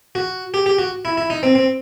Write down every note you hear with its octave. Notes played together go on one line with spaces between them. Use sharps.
F#4
G4
G4
F#4
E4
E4
D#4
C4
C4